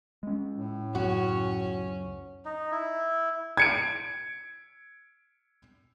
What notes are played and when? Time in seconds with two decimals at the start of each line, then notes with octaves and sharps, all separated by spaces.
0.23 G#3 C#4
0.56 A2
0.95 C#2 F#2 C#4 F#4
2.45 D#4
2.71 E4
3.57 G#6 C#7 D7